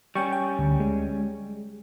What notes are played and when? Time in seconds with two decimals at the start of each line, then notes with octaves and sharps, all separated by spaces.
0.15 G3 C#4 G5 C#6
0.33 G5
0.59 D2
0.80 G#3